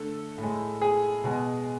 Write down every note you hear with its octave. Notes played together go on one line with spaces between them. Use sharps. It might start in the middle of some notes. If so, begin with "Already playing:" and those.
Already playing: D3 A3 A4
A2
G#3
G#4
B2 G#3